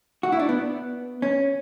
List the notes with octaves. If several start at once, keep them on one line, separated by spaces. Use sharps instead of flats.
F#4
E4
D4
B3
C#4